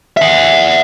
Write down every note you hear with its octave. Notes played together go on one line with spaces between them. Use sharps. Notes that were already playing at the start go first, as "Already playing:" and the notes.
E5 F#5